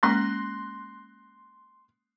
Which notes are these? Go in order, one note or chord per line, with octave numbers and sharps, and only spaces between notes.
G#3 A#3 C#4 C6 F#6 A#6